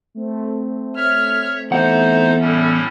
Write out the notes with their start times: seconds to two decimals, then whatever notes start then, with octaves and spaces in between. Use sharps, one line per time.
0.15 A3 C4
0.96 C#5 E5 F6
1.71 E2 D#4 A4 C5 E5 F#5
2.40 A2 G3 C#4